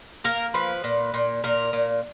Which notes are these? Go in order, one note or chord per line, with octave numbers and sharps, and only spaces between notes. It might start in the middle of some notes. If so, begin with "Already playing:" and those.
A#3 A#4
F3 B4
A#2
A#2
A#2 A#4
A#2